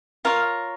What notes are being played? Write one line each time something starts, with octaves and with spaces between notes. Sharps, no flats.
F4 A#4 C#5 F5